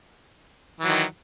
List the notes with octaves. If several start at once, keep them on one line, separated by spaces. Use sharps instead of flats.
D#3 E3 F#3